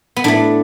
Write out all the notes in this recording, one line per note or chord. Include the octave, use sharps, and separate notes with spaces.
B3
A2 A3 D4